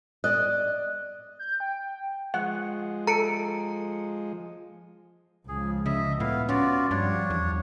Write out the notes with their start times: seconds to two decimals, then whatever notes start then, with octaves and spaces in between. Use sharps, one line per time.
0.24 D5 D#5 F#6
1.39 G6
1.60 G5
2.34 F3 G#3 F#5
3.07 A4 A#5 C#7 D7
5.48 C#2 F3 G#4
5.86 C#3 D#5 E5
6.20 A2 B3 E4 F5
6.49 C#4 F4 F#4 D5
6.91 G2 F3 G3 D4 C#5
7.30 E2